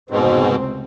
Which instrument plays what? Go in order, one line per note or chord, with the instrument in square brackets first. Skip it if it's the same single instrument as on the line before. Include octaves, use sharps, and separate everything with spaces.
[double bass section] F1 C#2 C4 [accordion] G#2 B2